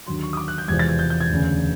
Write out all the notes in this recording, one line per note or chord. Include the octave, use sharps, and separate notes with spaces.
D#2 D3 F#3 C6
C#6
D#6
D6
F#6
G6
E1 E2 C3 F3 G#3 G#6
A6
G#6
G6
G6
G#6
E1 D2 C#3